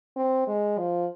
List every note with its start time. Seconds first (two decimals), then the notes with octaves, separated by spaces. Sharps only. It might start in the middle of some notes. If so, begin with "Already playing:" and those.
0.16 C4
0.47 G#3
0.78 F3